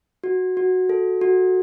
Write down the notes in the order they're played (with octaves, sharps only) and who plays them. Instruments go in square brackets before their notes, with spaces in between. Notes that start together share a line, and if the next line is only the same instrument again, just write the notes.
[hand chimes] F#4
F#4
A4
F#4